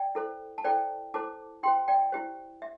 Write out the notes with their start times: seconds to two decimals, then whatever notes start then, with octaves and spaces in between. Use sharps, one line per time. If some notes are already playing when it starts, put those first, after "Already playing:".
Already playing: D5 G5
0.15 E4 A4 C5
0.58 A5
0.64 E4 A4 C5 D5 G5
1.14 E4 A4 C5 A5 D6
1.63 E4 G4 C5 G5 C6
1.88 D5 G5
2.12 E4 G4 C5
2.62 E5